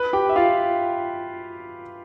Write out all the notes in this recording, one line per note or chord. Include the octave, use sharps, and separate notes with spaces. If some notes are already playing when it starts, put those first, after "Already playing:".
Already playing: B4 B5
G4 G5
E5
F4 F5